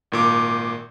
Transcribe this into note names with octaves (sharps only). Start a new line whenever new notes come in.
G#1 A#2 D6